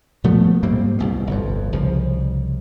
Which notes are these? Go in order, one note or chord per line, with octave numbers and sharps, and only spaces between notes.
A#2 F3 A3 B3
G#2 G3 A#3 C4
C2 B2
G1 F2
C2 C#3 F3